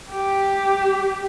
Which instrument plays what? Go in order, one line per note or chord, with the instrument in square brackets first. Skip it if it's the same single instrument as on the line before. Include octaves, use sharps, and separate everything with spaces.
[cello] G4